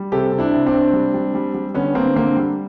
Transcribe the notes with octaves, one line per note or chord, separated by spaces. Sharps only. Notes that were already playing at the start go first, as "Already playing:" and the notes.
Already playing: G3
C3 G4 A4
C3
D4 E4
C3
C4 D4
C3
G3
G3
G3
G3
D3 B3 C#4
D3 A#3 C4
D3 A#3 C4
G3